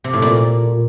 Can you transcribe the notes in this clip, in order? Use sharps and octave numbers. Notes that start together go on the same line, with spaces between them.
C3
A2
A#2